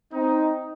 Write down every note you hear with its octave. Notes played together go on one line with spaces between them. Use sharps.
C4 D#4